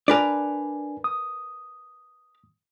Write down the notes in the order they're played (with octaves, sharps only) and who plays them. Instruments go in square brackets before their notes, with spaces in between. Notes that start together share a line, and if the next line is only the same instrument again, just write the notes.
[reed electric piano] D4 G#5 [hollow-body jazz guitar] A#4 B4 D5
[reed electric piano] D#6